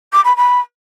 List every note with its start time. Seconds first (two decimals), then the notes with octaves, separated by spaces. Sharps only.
0.12 D6
0.24 B5
0.36 B5